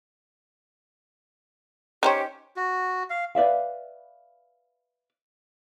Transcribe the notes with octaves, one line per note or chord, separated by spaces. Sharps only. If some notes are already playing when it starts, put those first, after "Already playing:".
D#3 C#4 G4 C5 C#5
F#4
F5
B4 D5 E5 F5